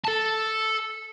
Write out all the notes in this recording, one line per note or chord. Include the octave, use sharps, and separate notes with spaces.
A4 A5